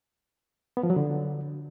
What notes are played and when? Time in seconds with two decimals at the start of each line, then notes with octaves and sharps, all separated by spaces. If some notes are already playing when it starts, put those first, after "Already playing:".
0.77 B3
0.83 F3
0.90 F#3
0.96 D3